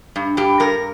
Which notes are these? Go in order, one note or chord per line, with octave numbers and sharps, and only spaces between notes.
G2
G2 G4
G2 A#4